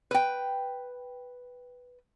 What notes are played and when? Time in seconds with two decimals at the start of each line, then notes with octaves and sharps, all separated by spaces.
0.11 B4 G5